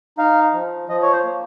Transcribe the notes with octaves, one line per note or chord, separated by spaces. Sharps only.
D#4 F5
F3
F3 D#5
C#5
C5
A#3